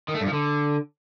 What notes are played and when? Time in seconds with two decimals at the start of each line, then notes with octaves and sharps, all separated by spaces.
0.08 D#3
0.15 A3
0.21 G2
0.27 F3
0.33 D3